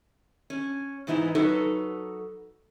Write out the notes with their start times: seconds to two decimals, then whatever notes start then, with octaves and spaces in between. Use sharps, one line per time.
0.50 C#4
1.07 G#2 E3 B3 D#4 E4
1.35 F#3 D#4 F#4 A4 B4